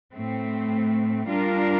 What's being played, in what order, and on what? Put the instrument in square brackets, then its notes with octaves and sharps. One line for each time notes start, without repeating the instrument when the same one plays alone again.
[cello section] A2 A3 C4
G3 D4 F4 A#4